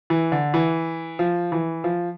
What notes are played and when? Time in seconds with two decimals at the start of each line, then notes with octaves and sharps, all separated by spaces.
0.10 E3
0.32 D3
0.54 E3
1.19 F3
1.52 E3
1.84 F3